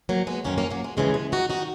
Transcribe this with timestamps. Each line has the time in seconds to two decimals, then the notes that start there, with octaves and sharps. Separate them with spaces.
0.09 F#3 A#3
0.27 G#3 B3
0.44 F#2 D#3 A#3 C#4
0.58 A#3 C#4
0.70 F#3 A#3
0.84 G#3
0.97 D#2 C#3 E3 G#3
1.14 G#3
1.32 D#4 F#4
1.50 D#3 D#4 F#4